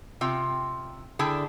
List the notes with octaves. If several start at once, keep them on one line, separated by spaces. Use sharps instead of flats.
C3 F4 G5
D3 D4 E4 G#4 G5